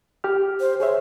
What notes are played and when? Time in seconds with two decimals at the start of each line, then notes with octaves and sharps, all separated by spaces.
0.24 G4 F6
0.60 C5
0.80 G#4 C5 C#5 E5